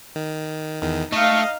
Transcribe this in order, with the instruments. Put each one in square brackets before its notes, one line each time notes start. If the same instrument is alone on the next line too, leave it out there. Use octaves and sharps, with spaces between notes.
[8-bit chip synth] D#3
E2 D#3
[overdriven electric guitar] A3 [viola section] D#4 F5 [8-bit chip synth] D#5